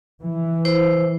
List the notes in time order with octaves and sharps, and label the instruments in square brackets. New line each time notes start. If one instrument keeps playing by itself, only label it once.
[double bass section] E3
[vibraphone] E4 C5